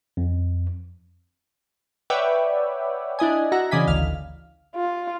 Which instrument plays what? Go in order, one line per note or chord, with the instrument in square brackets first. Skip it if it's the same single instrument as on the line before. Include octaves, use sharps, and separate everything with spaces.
[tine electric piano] F2
[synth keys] B4 C#5 D5 E5 F#5 G5
D4 E4 D#5 G#5
F#4 E5 F#5 A#5
C#3 E3 D5 D#5 G#5 B6
G#1 D2 F5 F6
[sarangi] F4